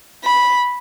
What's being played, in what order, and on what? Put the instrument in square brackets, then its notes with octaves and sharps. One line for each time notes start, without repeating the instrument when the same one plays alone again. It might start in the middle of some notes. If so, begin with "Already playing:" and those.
[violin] B5